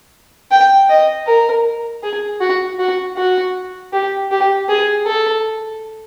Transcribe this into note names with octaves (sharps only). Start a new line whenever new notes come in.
G5
D#5
A#4
G#4
F#4
F#4
F#4
G4
G4
G#4
A4